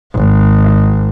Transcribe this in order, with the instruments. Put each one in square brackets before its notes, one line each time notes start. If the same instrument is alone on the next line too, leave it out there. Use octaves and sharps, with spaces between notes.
[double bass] G#1